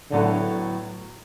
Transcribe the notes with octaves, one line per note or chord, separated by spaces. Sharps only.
A2 D3 F#3 B3 E4